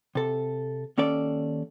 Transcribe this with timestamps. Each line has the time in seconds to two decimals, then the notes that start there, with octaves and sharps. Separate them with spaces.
0.15 C3 A4
0.98 D#2 C#4 A4 D5